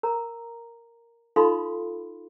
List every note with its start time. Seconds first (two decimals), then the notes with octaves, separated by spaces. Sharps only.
0.03 A#4 A#5
1.36 D#4 F4 A4 F5 B5 C6